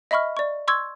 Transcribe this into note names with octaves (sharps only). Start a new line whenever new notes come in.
D#5 E5 B5 C#6 F6
D5 C#6
C6 C#6 E6 G#6